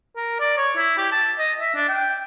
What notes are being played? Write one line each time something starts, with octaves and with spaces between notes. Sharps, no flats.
A#4
D5
C#5
E4
G4
A5
D#5
E5
D4
G5